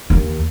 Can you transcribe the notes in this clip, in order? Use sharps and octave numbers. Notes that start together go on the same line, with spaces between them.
D#2